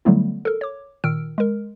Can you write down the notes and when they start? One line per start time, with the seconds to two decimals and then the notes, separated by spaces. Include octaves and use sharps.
0.05 D3 F#3 G3 A3 B3 E4
0.45 A4 A#4
0.61 C#5 D6
1.04 A#2 D#3 E6 F6 D7
1.38 G#3 A#4